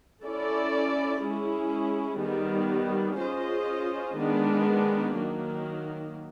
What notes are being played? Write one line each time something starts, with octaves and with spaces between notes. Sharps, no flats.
C#4 E4 A4 D5
G#3 C#4 E4 G#4
D#3 G3 B3
C#4 F4 G#4 C5 D#5
D#3 G#3 B3 D4
D#3 F#3 A#3